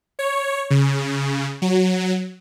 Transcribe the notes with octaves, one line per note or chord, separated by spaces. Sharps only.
C#5
C#3
F#3